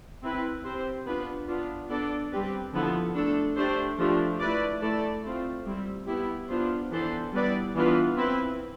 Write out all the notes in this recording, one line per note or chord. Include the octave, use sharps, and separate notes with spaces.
C4 E4 B4
C4 G4 C5
B3 D4 F4 B4
B3 D4 F4
B3 D4 A4 D5
G3 C4 G4 B4
D3 F3 B3 E4 A4
A3 D4 A4
A3 D4 G4 C5
F3 A3 D4 G4
A3 E4 B4 D5
A3 E4 A4 D5
A3 C4 F4
G3 C4 E4
B3 E4 G4
B3 D4 F4 C5
E3 B3 D4 A4 C5
G3 B3 E4 B4 D5
E3 B3 D4 F4 B4
C4 E4 B4